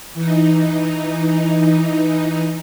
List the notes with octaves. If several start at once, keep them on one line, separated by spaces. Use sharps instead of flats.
E3 D#4